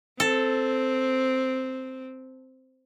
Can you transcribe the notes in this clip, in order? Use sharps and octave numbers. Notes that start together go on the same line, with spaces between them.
C4 A4